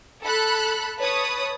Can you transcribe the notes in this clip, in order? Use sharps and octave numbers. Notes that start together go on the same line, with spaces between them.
A4 B5 F#6
B4 C#5 A5 B5 D#6